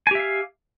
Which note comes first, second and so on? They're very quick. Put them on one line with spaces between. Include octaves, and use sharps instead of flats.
G#5 G4 E5 F5